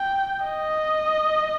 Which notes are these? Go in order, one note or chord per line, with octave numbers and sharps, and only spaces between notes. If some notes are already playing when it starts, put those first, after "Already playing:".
Already playing: G5
D#5